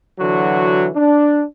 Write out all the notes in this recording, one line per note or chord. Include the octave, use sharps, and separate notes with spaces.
D3 E3 F#3 F#4
D4